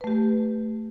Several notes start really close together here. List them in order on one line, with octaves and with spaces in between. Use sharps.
B4 A3 G4